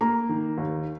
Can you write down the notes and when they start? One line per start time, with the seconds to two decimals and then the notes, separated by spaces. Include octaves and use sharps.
0.01 A#3 A#5
0.29 D#3
0.58 D#2